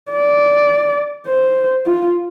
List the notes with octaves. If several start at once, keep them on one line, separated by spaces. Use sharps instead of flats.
D5
C5
F4